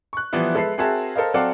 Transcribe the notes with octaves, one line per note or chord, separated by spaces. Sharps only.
C#6 F#6
E3 F3 G3 B3 E4
G#3 A4 B4 E5 C7
C4 F#4 G#4 A#4 E5 A5
A4 A#4 C5 D#5 F5
F#3 C4 A4 D5 F5 F#5